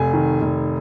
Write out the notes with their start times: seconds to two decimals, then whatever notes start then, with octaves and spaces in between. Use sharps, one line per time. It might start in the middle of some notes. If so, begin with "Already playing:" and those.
Already playing: F1 G#5
0.13 D#3
0.41 F1